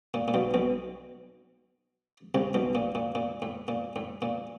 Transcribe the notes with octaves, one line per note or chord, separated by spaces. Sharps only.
A#2
A#2
B1 B2
B1 B2
C2 C3
B1 B2
A#2
A#2
A#2
A2
A#2
A2
A#2